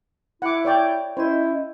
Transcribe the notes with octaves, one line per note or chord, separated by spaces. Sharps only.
E4 F#5 D6
C#5 D5 G5
C#4 E4 C5 D#5